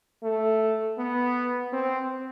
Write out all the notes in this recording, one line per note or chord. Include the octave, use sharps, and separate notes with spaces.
A3
B3
C4